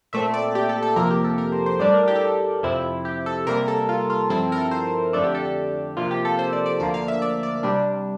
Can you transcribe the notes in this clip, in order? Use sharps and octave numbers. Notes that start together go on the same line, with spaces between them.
A#2 A3 C4 E5
D5
G4
A4
A4
F2 C3 F3 A#3 A#4
G4
A4
A#4
C5
C5
A2 G3 D4 D5
A#4
G4
A4
G4
F2 C3 F3 C4 E4
G4
A4
C3 G3 A#3 A#4
A4
F4
F4
G2 F3 C4 E4 A4
A#4
A4
C5
F2 D3 A3 D4 A4
G4
A4
A4
C3 F3 A#3 F4
G4
A4
C5
D5
D5
D2 D3 F3 A#3 D5
F5
E5
D5
D5
C3 G3 D4